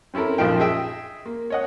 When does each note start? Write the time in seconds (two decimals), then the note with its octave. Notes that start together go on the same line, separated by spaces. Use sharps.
0.14 C4 C#4 E4 A4 A#4
0.38 A#1 F#2 F3 D#4 F5 G5
0.60 G#4 D#5 E5 G5
1.26 A#3
1.50 C#5 D#5 F#5